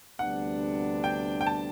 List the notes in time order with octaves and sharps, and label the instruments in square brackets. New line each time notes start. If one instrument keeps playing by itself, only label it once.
[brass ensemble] D2 C3 G3 B3 D4 [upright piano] F#5
[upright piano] G5
G5
A5